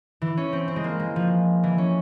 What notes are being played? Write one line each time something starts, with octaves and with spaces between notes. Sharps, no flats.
E3
C#4
C4
C4
G#3
A#3
G#3
F3
E3
C#4